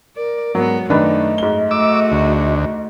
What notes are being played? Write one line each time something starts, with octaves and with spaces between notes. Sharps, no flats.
A#4 D5
G#2 F#3 B3 A#4
F#2 D#3 A3 D4 B4 D#5
G#2 G7
A3 F#4 D6 E6
D2